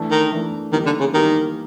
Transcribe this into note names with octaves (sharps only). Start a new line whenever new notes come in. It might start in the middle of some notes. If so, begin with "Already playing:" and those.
Already playing: E3 A3 D4
D#3
E3 A3 D4
D#3 E3 G3 A#3 D#4 G4
D3
C#3
D#3 E3 G3 A#3 D#4 G4